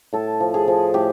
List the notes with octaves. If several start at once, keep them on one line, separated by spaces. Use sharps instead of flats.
A2 A4
F3
G#4
F3
A2 G4